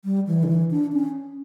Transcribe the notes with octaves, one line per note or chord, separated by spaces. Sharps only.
G3
E3
D3
E3
D4
C#4